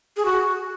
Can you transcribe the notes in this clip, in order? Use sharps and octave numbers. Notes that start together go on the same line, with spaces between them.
G#4
F#4